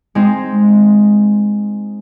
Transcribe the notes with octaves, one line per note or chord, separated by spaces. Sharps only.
G#3 C4 D#4